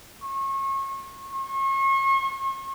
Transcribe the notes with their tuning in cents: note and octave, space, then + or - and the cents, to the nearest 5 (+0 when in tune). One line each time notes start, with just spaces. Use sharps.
C#6 -30
C#6 -40